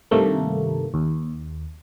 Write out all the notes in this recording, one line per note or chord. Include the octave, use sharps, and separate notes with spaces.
G2 C3 D#3 A3 A#3
D#2